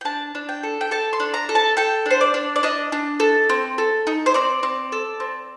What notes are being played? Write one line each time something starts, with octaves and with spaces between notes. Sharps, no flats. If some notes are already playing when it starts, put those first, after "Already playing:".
G5
D4 A5
D4
G5
A4
G5
A4 A5
C6
D4
A#5
A4
A5
A4 G5
D4 C5
D5
D4
D5
D4 D#5
D4
A4
C4
A4
D#4
C5
C4 D5
C4
A4
C4